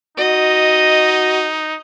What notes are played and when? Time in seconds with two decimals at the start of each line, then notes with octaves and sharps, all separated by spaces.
0.18 D#4 F#4 D#5